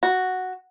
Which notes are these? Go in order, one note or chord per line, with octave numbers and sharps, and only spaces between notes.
F#4